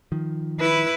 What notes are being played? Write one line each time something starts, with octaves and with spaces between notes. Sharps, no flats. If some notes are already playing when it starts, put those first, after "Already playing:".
D#3 F3
E4 B4